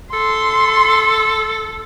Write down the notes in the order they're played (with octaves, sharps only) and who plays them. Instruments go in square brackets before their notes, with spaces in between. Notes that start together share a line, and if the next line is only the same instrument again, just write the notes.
[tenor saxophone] A4 [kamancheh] C6